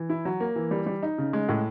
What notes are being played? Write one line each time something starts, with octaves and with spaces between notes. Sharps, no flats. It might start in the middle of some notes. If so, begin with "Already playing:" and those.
Already playing: E3
E4
F#3
A#3
E3
G3
G3
D#4
C#3
G#3
A2